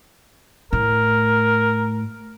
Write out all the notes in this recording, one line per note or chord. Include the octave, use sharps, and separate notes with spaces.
A2 A#4